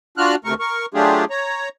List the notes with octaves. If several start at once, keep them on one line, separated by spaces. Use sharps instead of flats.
D4 F4 F#4 F6 F#6
D2 C3 A3 A#4 C#6
A#4 C#6
F#3 A3 D4 F4 G4 G#4
C#5 A#5